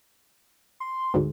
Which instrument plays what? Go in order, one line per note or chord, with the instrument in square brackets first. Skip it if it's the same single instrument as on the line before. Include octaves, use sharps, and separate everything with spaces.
[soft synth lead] C6
[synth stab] D2 G#2